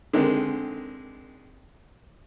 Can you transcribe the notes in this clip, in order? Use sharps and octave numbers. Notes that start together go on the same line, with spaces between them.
D3 D#3 G#3 C4